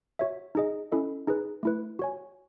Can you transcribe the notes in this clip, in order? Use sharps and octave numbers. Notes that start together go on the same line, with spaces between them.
F#4 C#5 E5
D#4 G#4 D#5
C#4 E4 A4 D#5
D#4 G#4 B4
A3 E4 B4
F#4 C#5 G#5